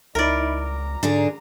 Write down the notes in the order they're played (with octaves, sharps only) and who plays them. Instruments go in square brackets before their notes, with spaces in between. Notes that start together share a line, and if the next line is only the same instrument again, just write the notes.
[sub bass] C#2 [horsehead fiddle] D#4 E4 [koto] A#4 D5
[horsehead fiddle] A#5
[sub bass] G#2 [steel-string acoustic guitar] D3 D4 G#4